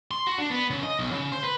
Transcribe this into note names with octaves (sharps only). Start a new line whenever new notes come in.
C6
F#4
D4
B3
C#3
D#5
B1
C#3
C5
B4